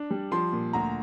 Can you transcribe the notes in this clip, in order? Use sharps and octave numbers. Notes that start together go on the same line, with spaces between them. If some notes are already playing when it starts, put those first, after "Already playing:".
Already playing: D4
G3
F3 C6
A#2
D2 A#5